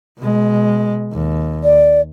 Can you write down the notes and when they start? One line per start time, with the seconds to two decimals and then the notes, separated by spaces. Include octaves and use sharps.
0.19 B2 G#3
1.13 D#2
1.63 D5